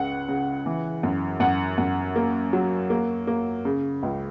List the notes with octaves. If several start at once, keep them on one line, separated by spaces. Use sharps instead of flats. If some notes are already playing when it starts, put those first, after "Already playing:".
Already playing: C#2 C#3 F#5
C#3
E3
F#2
F#2 F#5
F#2
A#3
F#3
A#3
A#3
C#3
C#2